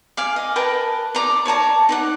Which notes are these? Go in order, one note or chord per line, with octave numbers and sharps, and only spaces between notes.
D5 F5 G#5
D#5
A#4 B4 G5 A5
D5 A#5 D6
C#5 D5 A5 A#5
D#4 D5 F#5